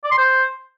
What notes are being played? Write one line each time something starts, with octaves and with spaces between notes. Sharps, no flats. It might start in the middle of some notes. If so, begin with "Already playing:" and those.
D5
C6
C5